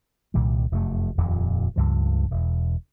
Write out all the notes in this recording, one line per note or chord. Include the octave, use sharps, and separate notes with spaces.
C2 A#2 D#3 G3
F1 F#2 A3
D#1 F2 A#2
C#2 G2 F3
E1